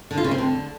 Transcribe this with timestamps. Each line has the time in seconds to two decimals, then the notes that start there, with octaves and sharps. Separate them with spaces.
0.11 D3
0.18 F4
0.24 C#3
0.31 C4
0.38 D3